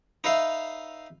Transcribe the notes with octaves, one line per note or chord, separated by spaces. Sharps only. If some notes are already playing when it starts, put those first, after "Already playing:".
D#4 B4 E5 F5